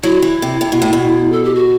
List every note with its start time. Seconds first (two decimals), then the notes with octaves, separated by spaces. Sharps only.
0.03 F#3 E4
0.22 E3
0.42 C3
0.61 C3
0.72 B2
0.82 A2
0.93 B2
1.32 A4
1.44 G4
1.55 F#4